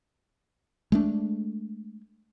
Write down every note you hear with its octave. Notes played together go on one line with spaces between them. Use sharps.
G#3 A3 D4